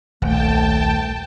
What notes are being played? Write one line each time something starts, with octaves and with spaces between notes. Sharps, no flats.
D#1 B1 A3 G5 A5